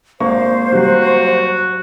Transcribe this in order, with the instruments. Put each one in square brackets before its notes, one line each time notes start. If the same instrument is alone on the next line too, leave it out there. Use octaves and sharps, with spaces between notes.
[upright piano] G#1 A#3 C#6 [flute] C5
[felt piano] F#3 G3 [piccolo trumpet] F#4